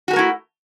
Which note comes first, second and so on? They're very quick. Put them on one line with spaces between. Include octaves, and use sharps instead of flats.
F#4 G4 A#4 A3 E4